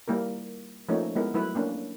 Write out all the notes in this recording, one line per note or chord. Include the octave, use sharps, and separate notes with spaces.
G3 A#3 E4 A#4
F3 A3 A#3 C#4 D#4 C#5
G#3 B3 E4 A#4
F#3 A3 E4 B4
A#3 C#4 D4